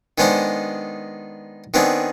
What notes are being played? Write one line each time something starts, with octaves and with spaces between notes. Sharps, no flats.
D#3 G#3 B3 D4 D#4 C5
D#3 B3 C4 D4 G#4